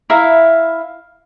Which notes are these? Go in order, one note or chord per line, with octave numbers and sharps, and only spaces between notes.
E4 E5 F5 A#5